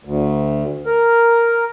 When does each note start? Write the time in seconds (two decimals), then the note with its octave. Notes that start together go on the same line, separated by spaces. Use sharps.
0.05 D2
0.86 A#4